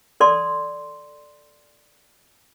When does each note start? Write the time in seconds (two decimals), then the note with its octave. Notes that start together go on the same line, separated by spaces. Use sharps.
0.20 A4 D5 C6